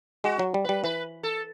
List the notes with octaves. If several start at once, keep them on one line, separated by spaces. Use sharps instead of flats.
G#3 F#4
F#3
G3
G3 B4
E3 B4
A4